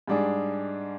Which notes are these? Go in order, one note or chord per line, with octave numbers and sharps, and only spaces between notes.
G#2 G3 D4 G#4